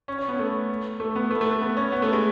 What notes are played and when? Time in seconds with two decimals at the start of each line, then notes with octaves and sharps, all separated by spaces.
0.08 C#4
0.18 C#4
0.28 B3
0.39 A3
1.00 A3
1.15 B3
1.31 A3
1.41 A3
1.51 A3
1.61 B3
1.77 C#4
1.92 B3
2.02 A3
2.13 G#3